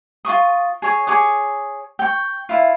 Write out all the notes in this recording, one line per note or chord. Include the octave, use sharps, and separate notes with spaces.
F4 F#4 C#6 D#6
G#4 C#5 D#6
G#4 C#5 D6 D#6
G5 C#6
E4 F4